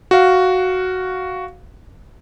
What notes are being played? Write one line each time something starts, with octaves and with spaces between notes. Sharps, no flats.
F#4 F5